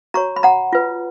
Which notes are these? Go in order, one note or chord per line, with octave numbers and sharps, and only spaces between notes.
F#4 C#5 A#5 C#6
B5
F#5 A#5
F4 B4